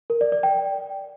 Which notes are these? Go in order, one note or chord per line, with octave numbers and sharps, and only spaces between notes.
A#4
D5
D5
G5